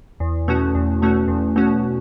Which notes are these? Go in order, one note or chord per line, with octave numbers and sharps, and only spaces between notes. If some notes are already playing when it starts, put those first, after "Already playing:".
E2
B2 A3 C#4 F#4
E2
B2 A3 C#4 F#4
E2
B2 A3 C#4 F#4